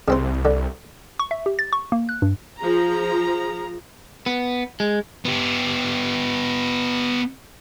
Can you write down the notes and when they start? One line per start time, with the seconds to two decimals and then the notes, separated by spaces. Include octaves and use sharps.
0.08 C2 C#3 C4 C5
0.45 D3
1.19 C#6
1.31 E5
1.46 G4
1.59 A6
1.73 C#6
1.92 A#3
2.09 F#6
2.22 G2
2.59 F3 G#4 A#5
4.26 B3
4.80 G#3
5.25 B3 G4